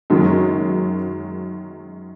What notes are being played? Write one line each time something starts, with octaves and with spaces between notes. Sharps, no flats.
F#2 D#3 G#3